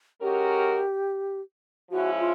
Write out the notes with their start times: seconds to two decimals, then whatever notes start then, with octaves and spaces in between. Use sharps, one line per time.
0.21 G#3 C#4 F#4 G4 A#4
1.91 F3 G#3 C#4 E4 F#4
2.19 F4